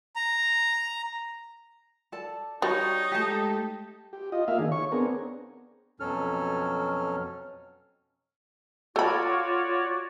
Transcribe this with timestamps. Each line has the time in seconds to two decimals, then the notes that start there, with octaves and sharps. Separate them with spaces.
0.16 A#5
2.12 A4 D5 A5
2.62 G3 D#4 F#4 C#5
3.12 G#3 A3 G4 A4 A5
4.13 G4
4.32 F4 D#5
4.48 A#3 E5 F5
4.59 D#3 D4 G#4
4.72 C#5 C#6
4.92 B3 C4 D4 G#4 A#4
6.00 F2 B2 F#3 C#4 A4 F6
8.96 F4 F#4 A4 C#5 D5 B5